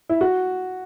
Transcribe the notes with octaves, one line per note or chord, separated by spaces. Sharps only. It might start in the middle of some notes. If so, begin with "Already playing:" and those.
E4
F#4